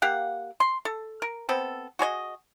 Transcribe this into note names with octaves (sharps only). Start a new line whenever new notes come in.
A#3 G4 F5 F#5
C6
A4
A#4
B3 C4 A4
F#4 G#4 C#5 D#5